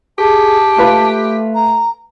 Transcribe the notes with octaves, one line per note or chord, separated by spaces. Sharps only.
G4 G#4 A5
A3 F4 B4 B5
A#5